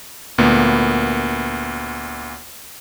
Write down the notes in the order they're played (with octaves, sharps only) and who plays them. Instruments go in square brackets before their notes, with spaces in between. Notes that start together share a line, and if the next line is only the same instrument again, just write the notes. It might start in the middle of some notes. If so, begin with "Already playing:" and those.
[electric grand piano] D2 A#2 A#3 B3